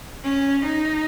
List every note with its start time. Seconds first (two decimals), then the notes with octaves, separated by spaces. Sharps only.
0.24 C#4
0.64 D#4